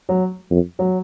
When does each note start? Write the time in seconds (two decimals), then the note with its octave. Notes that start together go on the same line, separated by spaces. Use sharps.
0.09 F#3
0.51 F2
0.79 F#3